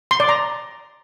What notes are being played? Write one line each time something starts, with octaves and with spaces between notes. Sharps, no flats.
C6
D5
A#5